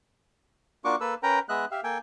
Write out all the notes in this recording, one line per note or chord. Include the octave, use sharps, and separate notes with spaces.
A#3 D4 F4 F#4 C#6 D6
A#3 A4 B4 E6
C#4 A#4 B4 G5 A#5
G#3 B3 D#5 E5 F#6
G4 E5 F5
A#3 A4 G5 G#5